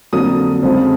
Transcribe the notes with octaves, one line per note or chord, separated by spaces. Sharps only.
F2 D3 F#3 A#3 D#6
F2 C#3 F3 G#3